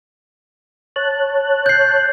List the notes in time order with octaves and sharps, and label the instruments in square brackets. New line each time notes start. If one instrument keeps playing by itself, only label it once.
[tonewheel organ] C#5 A5 F#6
[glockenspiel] G6 C7